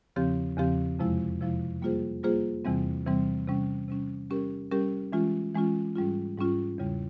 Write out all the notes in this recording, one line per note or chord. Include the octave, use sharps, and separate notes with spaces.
E2 C#3 F3 C4 G4
E2 C#3 F3 C4 G4
F2 C3 F3 G#3 E4
F2 C3 F3 G#3 E4
G3 A#3 F4 G#4 C5
G3 A#3 F4 G#4 C5
E2 C3 E3 G3 C4
E2 C3 E3 G3 C4
C3 G3 C#4
C3 G3 C#4
G3 C#4 G4 A#4
G3 C#4 G4 A#4
E3 G#3 C#4 F4
E3 G#3 C#4 F4
G#2 G3 C#4 F4
G#2 G3 C#4 F4
E2 C#3 G3